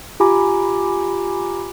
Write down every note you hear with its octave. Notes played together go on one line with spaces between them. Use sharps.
F4 G4 G#5 A#5 B5 D6